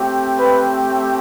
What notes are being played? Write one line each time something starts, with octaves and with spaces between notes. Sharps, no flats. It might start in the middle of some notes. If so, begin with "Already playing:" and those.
Already playing: A3 C4 G4
B4